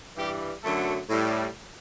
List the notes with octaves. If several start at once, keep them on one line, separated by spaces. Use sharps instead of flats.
G2 E3 G3 G4
F#2 D3 F#3 A3 A4
A2 G3